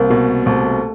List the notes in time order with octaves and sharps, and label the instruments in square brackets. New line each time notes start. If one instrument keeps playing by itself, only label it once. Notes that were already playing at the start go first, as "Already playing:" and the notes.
Already playing: [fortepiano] C2 [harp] A#3
[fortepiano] B2
[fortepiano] C2 [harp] A3